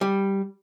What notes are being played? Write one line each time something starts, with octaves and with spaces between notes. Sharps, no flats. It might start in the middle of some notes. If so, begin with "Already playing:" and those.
G3